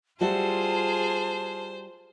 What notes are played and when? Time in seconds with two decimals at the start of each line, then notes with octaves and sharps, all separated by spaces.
0.21 G3 F4 F#4 G#4 C5 E5 A5